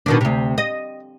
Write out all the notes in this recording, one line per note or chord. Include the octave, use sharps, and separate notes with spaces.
B2 D#3 D4
D2 C3
D#5